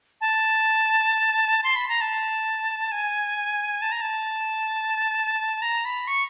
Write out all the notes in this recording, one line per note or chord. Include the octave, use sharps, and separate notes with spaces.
A5
C6
B5
A#5
A5
G#5
A5
A#5
A5
A#5
B5
C#6